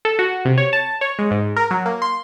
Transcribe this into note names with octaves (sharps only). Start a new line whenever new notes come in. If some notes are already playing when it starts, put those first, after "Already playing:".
A4
F#4
C3
C#5
A5
C#5
G#3
G#2
A#4
F#3
A#3
C6